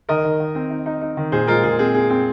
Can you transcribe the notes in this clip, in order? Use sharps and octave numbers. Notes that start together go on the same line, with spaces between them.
D#3 A#4 D#5
D#3
D#3
C4
D#4
D#4
D#4
D#3
A#2 G#4 C5
G#3 F4 A#4
A#2 G#4
C4 G#4
C4 G#4
C4